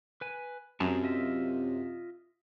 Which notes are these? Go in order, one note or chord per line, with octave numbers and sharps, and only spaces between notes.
B4 G#5
F#2 C3 G#4 A5 A#5
F4 D#5 E5